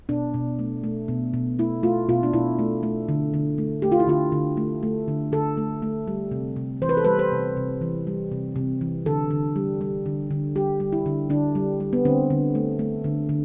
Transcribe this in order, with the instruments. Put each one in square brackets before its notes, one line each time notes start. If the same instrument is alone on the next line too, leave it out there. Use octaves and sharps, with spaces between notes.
[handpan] B2 D4
B2
A3
A3
B2
B2
A3 E4
A3 F4
B2 F4
D4
B2 E4
A3
A3
D3
D3
A3
A3 G4
F4
E4
D3 F4
D3
A3
A3
D3
D3 A4
A3
A3
G3
C3
C3
E3 C5
B4
A4
G3 B4
C5
C3
C3
E3
G3
C3
C3
E3
D3 A4
D3
G3
G3
D3
D3
G3 G4
G3
E4
D3
D3 D4
G3
G3
B3
D3 C4
D3
A3
A3
D3
D3